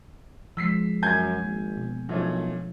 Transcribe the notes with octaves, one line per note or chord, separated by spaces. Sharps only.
F3 G#3 E6 B6 C7
F#2 C#4 G#5 G6 G#6
G#1 A#3
B2
B1 A#2 F3 A3 C#4 D4